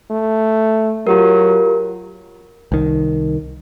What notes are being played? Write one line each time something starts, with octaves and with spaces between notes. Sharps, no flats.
A3
F#3 F4 G4 A#4
C2 D#3